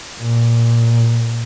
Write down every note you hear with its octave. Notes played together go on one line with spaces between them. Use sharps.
A#2